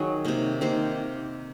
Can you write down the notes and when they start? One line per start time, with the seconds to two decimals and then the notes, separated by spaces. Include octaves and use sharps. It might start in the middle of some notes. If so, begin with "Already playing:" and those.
Already playing: D#3 F#3 G#4
0.25 C3 D#3 A#3
0.61 C3 D#3 A#3 C5